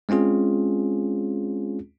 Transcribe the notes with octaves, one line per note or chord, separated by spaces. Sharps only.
G#3 C4 C#4 F4 G#4